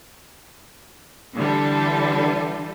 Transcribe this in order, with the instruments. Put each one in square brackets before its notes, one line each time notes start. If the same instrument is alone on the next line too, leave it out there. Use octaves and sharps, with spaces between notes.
[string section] D3 E3 G3 A4